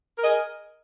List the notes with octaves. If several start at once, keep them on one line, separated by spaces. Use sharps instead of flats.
G#4 A#4 D#5